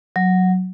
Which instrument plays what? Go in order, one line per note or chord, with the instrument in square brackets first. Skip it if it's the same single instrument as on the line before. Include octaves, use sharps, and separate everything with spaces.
[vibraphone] F#3